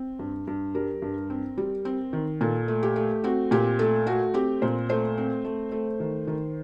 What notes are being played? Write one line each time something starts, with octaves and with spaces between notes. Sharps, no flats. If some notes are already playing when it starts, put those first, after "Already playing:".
Already playing: C4
G2
G2
G3 A#4
G2
C4
G3
C4
D#3
A#2 A4
A3
G4
A3
C4 F#4
A#2 G4
A3 A4
A3 F#4
C4 G4
A#2 C5
A3 C5
C4
A3
A3
D#3
D#3